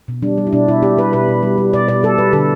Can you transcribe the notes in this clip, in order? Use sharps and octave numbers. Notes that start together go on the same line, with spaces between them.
B2
G3 D4
G3
E4
B2 D4
B2 E4
G3 G4
G3 B4
B2 B4
B2
G3
G3
B2 D5
B2 D5
G3 A4
G3 B4
D3 A4